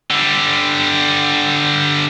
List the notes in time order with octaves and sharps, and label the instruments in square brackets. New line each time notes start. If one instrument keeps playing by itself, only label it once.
[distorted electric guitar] D3 G3